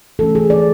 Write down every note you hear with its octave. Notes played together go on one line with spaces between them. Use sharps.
E3 A3 C#4 A4
G#4
D5